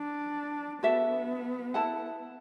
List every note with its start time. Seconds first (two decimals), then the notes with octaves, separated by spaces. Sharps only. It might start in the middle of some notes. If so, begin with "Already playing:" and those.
Already playing: D4
0.83 B3 F#4 A4 E5
1.74 E4 A4 F#5 A5